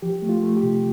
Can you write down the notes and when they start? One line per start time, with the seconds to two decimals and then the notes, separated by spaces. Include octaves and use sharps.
0.02 F3 G4
0.22 A3
0.29 F4
0.43 A3
0.56 G4
0.63 C3